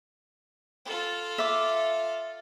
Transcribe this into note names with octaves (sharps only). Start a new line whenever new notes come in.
F4 A4
E5 D6